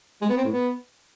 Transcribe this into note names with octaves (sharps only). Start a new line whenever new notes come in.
G#3
B3
C4
A2
B3